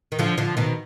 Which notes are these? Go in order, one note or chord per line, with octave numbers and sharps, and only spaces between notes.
D#3
D3 F3
D3 F3
B2 D#3